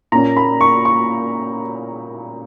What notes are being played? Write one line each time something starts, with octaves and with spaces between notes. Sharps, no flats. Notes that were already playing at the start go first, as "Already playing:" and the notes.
A#2 A#3 C#4 A#5
B5
C#6
C#6